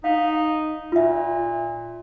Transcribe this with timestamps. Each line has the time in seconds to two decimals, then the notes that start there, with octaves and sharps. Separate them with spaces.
0.04 D#4 F5
0.92 A#2 F4 E5